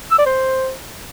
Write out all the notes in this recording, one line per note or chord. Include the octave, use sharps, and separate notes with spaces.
E6
D5
C5